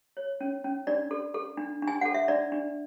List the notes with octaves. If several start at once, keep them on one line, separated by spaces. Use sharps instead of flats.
C#5
C#4
C#4
D4 D5
A4
A4
D4
D4
G#5
A4 F#5
E5
D4 D5
D4